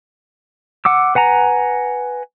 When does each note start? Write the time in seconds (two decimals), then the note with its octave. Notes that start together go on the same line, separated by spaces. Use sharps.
0.85 F#5 D6 E6
1.15 B4 F#5 G#5 A#5